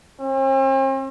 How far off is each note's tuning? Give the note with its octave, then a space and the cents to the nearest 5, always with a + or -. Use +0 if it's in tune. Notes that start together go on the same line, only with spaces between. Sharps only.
C4 +45